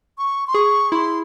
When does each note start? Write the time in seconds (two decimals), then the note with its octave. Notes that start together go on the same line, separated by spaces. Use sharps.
0.18 C#6
0.47 C6
0.54 G#4 C#6
0.92 E4 C6